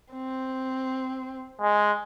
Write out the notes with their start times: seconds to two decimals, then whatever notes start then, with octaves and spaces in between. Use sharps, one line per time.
0.13 C4
1.60 G#3